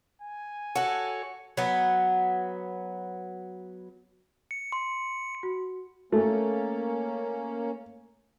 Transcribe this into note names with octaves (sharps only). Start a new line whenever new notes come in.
G#5
F#4 A4 C#5 F#5
F#3 B3
C#7
C6
F#4
A3 A#3 C#4